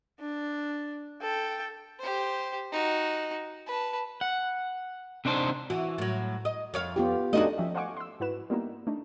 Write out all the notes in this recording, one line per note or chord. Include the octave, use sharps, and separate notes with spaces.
D4
A4 G5
G4 C5
D#4 F#4
B4 A5
F#5
C3 D4 D#4 C5 A5
E3 F#4
A2 F#3
D#5
F2 C#5 F5
B3 F4 G4
F2 A3 D4 D#4 F#4 D#5
F3 C#4 G4 E5
C5 F5 F#5 G#5 C#6 D6
C6 E6
G#2 E4 F#4 B4 E7
G3 A#3 B3 D#4 E4
A3 D4 D#4